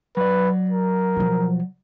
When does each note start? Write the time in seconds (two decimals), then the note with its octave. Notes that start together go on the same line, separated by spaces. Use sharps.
0.17 F#3 B4 D5
0.70 A#4
1.16 B2 F3